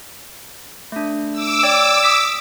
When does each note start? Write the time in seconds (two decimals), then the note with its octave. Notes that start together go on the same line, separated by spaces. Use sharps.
0.92 A3 D4
1.32 D6 E6
1.63 C#5 D5 G5
2.04 D#6 B6